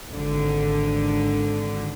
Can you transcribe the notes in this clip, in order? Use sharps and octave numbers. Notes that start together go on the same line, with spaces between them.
G#1 D3